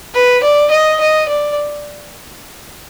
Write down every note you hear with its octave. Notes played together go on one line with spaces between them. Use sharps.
B4
D5
D#5
D#5
D5